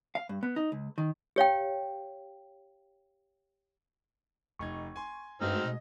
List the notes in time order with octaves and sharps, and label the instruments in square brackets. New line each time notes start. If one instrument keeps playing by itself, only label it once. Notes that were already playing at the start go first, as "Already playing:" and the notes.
[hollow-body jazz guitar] F5
G2
B3
D#4
C#2
D#3
[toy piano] G4 C#5 F5 G5
[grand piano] F1 D#4 G#6 [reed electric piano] C#6
[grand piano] G#5 C6
[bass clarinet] G2 [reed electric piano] G#3 A3 F#4 [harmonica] C4 D#4 F6
[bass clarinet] B2 [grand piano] D#5